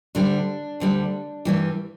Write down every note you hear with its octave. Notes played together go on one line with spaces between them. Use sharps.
D2 D3 G3 D4
D2 D3 G3
G2 E3 G3